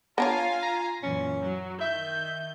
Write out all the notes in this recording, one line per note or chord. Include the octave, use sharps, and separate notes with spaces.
B3 D4 F4 C#5 F5 G#5 A#5
A#5
F#2 A#2 E3 C#4
F#3
D#3 E5 G6